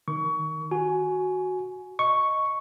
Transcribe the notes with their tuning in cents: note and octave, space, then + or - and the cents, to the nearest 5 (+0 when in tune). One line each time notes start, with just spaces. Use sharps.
D#3 +0 C#6 +25
F#4 +0 G#5 +15
D#5 +0 C#6 +0